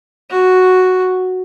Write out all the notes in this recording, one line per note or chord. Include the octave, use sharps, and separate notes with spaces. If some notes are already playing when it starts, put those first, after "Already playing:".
F#4